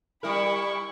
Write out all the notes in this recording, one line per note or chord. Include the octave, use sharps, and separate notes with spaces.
G3 E4 A#4 B5 C#6